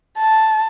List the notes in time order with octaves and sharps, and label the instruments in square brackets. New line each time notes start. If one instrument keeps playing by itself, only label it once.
[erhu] A5